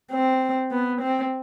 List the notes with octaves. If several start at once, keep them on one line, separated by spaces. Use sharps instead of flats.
C4
B3
C4